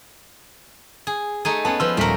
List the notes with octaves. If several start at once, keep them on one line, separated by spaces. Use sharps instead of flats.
G#4
A3 D#4 G#4
B3 C#4 G#4 A5
F3 F4 B4 E6
D#1 A3 A#4 B6 F#7